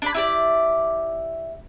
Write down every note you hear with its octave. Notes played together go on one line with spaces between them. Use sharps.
D4 D5 B5
E4 G4 D5